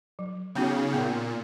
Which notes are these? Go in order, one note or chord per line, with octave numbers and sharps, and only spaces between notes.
F#3
C#3 B3 D#4 F#4
A#2 B3